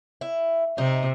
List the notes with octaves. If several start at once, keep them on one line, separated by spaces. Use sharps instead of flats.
E4
C3 D#4